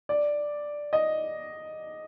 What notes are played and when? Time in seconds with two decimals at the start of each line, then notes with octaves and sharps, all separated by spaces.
0.09 D5
0.93 D#5